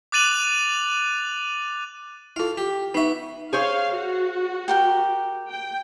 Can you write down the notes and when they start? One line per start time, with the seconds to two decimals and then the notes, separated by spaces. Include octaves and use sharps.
0.12 D6 F#6 A6 D#7 F7 F#7
2.36 E4 F4 A4 F5
2.58 G4
2.94 B3 D#4 E5 F#5 C#6
3.53 G#4 C5 C#5 F5
3.95 F#4
4.68 G4 A#4 G5
5.50 G5